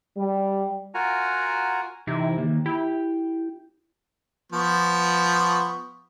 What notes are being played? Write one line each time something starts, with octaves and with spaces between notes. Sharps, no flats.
G3
F4 F#4 A#4 F#5 G#5 A#5
C3 E3 D#4 E4
D#3 A#3
E4 G4 G5
F3 B3 C#6